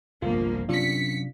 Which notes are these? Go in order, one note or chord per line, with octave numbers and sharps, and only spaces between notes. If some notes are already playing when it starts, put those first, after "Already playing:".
G1 C2 F3 A#3 F4
C3 F#3 C#4 D4 F4 B6 C#7